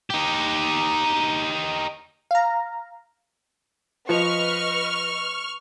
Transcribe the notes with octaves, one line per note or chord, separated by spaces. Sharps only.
D#4 G4
F5 A#5
F3 B4 D#5 C#6 F6